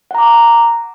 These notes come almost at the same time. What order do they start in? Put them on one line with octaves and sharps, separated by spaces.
F#5 A#5 D6